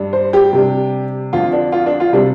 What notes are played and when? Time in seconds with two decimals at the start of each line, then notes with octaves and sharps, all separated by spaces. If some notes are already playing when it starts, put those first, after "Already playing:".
Already playing: G2 G3 D4
0.13 C5
0.33 G4
0.53 C3 G3 D4
1.33 F2 D3 F3 F4
1.52 D4
1.72 F4
1.86 D4
2.00 F4
2.13 C3 G3 C4 D4